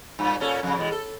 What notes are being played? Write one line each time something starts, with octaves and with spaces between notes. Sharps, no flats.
G2 A#2
A#2 C#4 A4
F2 C#3
B2 E3 G#3
A4